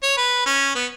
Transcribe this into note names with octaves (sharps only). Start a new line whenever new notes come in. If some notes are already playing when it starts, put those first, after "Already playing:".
C#5
B4
C#4
B3